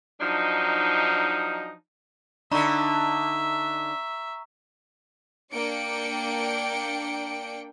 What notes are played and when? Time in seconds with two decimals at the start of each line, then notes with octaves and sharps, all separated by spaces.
0.21 F3 F#3 D4 D#4
2.51 D3 D4 D#4 E5 A#5 B5 C#6
5.53 A#3 D4 D5 G5 C#7 D7